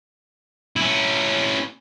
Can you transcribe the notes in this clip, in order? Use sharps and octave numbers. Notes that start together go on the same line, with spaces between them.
C#4 E4